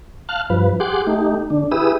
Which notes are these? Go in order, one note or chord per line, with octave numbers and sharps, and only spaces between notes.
F5 A5 F6 F#6
G2 F3 B4
G4 G#4 F#5 C6 D6
A3 D#4 G4
D3 D4
E4 G4 G#4 B4 D#6 E6